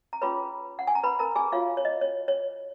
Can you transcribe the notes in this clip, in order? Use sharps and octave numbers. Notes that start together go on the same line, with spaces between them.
A#5
C#4 F4 G#4 B4 C#5 B5
F#5
G#5
A#5
B4 B5
A#4 A#5
G#4 G#5
F4 F#4 C#5 F5
C#5
D#5
C#5
C#5